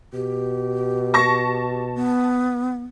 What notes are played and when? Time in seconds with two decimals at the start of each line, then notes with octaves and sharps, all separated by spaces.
0.14 B2 G4
1.14 A5 C#6 A#6
1.94 B3